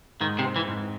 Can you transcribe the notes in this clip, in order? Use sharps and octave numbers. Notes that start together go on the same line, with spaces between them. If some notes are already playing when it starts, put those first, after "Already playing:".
G#2 D#3
C3
C4
E3
G#2